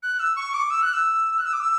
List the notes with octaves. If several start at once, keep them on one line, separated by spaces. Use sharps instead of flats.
F#6
E6
C#6
D6
E6
F#6
E6
F#6
E6
D6
E6